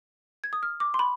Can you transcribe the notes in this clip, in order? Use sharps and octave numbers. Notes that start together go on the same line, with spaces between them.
G#6
D#6
F6
D6
C6
B5